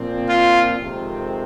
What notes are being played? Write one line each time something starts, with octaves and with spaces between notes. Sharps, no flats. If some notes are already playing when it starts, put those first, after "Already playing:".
Already playing: A#2 F3 C4
F4
F2 C3 D#3 G#3 C4